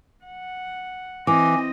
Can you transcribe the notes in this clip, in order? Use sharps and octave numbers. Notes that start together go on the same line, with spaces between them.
F#5
E3 C4 D#5 G#5 D6